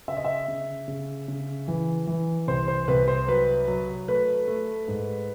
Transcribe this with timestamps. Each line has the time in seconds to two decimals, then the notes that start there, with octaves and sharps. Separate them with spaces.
0.08 C#3 E5
0.17 D#5
0.25 E5
0.48 C#3
0.88 C#3
1.28 C#3
1.68 E3
2.07 E3
2.48 C2 C5
2.68 C5
2.88 C2 B4
3.08 C5
3.28 F#3 B4
3.68 F#3
4.08 A3 B4
4.48 A3
4.88 G#2